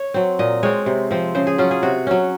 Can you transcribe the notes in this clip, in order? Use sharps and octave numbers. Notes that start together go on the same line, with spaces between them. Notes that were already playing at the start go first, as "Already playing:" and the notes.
Already playing: C#5
F#3 C4
A#2 D#5
G#3 C4 C#5
C3
F3 C4
C#3 C5
G#4
F#3 C#4 F4
G#4
C3 F#4
F#3 C#4